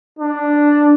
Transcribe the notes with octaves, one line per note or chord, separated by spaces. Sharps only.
D4